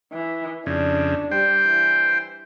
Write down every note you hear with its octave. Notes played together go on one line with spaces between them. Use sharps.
E3
F2 C#3 D4
G3 C5 G5
E3